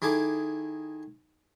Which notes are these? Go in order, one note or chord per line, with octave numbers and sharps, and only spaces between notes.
D#3 E4 G#4 A4 D6